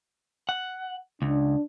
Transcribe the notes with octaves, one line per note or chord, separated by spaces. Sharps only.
F#5
C#2 D4